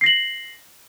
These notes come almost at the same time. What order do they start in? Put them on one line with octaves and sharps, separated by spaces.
C7 A#6 F#7